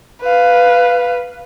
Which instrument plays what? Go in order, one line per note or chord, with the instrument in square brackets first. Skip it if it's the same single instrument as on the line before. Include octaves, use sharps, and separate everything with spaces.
[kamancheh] B4 F5